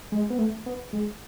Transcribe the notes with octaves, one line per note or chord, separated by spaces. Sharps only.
G#3
B3
A3
B3
G#3